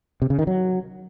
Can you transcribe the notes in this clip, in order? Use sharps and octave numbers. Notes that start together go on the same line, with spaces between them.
C3
C#3
D#3
F#3